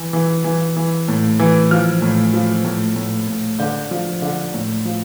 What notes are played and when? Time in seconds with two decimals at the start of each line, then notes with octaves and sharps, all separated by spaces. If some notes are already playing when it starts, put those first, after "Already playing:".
Already playing: E3
0.13 E3
0.44 E3
0.77 E3
1.08 A2
1.39 E3
1.71 F3 F6
2.02 A2
2.34 F3
2.64 A2
2.96 A2
3.27 A2
3.59 D3 G6
3.91 F3
4.22 D3
4.54 A2
4.85 F3